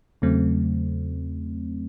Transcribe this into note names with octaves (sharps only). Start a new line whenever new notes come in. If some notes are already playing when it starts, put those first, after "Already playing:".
E2 C#3 F#3 A3 C4